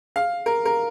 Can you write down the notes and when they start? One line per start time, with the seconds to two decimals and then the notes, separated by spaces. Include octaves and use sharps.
0.16 F5
0.46 A#4
0.65 A#4